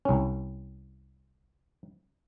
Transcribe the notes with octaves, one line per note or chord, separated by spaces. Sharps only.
C2 C#4